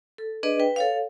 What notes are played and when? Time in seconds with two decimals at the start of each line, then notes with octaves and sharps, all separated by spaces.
0.18 A4
0.43 D4 G#4 B4 D5 D#5
0.60 B4 G5
0.76 A4 C#5 F5